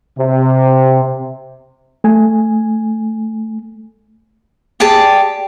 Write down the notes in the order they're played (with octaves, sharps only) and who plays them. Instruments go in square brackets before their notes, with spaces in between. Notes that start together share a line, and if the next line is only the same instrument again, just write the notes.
[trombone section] C3
[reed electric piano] A3 G#5
[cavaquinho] G4 G#4 D5 A5